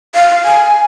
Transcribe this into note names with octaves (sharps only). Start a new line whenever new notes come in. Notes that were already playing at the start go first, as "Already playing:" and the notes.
F5
G#5